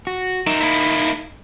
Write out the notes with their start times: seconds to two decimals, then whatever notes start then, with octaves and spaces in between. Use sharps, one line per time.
0.07 F#4
0.47 D#4 A#4 E5
0.61 A#3 E4